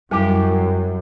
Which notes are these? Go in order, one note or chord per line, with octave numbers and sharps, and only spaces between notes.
F#2 G3 E4 G4